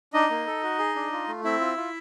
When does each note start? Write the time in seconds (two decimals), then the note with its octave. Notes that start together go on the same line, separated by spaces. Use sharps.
0.13 D4 D#4 D#5
0.30 A#3
0.47 A4
0.63 F#4
0.79 G#4
0.96 D4
1.12 F4
1.28 A3
1.44 C4 E4 E5
1.61 F4
1.77 F4